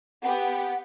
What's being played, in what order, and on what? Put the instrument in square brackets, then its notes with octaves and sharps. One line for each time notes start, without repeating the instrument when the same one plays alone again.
[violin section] B3 G4 [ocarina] F#5